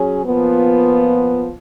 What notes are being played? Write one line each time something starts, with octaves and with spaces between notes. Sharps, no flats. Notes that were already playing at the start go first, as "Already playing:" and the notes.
Already playing: F#3 C#4 G#4
A#2 F3 B3